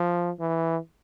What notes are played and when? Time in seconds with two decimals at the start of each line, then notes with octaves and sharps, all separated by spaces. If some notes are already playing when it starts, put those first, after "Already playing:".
Already playing: F3
0.40 E3